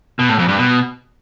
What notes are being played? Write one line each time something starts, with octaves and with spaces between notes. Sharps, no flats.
B2
A2
F2
G2
B2